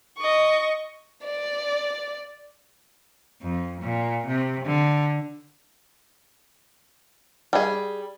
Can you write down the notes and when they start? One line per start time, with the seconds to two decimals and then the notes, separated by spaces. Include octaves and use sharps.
0.17 D#5 C#6
1.25 D5
3.42 F2
3.82 A#2
4.27 C3
4.66 D3
7.53 G3 G#4